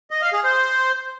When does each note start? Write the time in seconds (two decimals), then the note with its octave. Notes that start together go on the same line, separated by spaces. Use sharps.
0.11 D#5
0.22 F5
0.33 G#4
0.44 C5